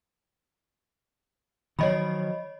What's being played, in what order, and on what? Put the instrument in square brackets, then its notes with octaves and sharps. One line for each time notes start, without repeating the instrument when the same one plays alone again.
[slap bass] D#3 F3 F#3 [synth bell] C#5 D#5 B5